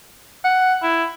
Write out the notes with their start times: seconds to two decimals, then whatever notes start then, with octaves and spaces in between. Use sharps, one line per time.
0.44 F#5
0.83 E4